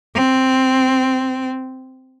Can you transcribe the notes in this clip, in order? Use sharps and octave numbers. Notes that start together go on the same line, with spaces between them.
C4